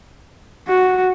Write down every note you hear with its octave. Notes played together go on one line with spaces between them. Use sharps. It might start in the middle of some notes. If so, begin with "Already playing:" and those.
F#4